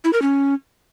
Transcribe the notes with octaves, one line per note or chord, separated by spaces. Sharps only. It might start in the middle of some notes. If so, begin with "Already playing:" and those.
E4
A#4
C#4